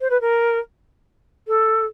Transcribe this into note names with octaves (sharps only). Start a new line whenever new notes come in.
C5
B4
A#4
A4